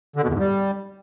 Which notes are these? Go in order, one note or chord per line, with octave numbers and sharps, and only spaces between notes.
D3
B2
E2
G#2
G3